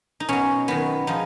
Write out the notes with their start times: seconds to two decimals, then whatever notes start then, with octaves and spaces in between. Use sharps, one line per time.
0.20 D#4
0.29 B2 F#3 C#4
0.68 F#2 D#3 F#3 B3
1.07 F3 G#3 D#4